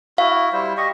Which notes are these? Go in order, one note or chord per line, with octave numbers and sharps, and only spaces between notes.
E4 F#4 F5
G3 E4 C5
G4 D#5 C#6